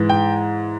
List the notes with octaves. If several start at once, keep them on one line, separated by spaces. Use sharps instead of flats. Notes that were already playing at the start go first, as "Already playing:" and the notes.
Already playing: G#2 E3
G5